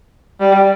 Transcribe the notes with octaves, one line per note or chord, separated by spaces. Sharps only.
G3